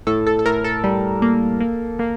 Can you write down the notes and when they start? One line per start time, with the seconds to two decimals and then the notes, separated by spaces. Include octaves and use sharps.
0.07 A2 A4
0.27 A4
0.39 A4
0.45 A2 A#4
0.64 A4
0.84 G3
1.22 A#3
1.61 A#3
1.99 A#3